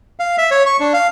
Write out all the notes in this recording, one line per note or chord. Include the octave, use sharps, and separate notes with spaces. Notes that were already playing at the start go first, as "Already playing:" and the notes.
F5
E5
C#5
C#6
D4
F5